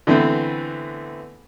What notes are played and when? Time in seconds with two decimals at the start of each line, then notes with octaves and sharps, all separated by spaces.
0.07 D3 E3 A3 B3 C4